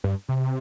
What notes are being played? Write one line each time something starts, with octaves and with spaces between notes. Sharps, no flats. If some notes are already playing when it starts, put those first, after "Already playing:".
G2
C3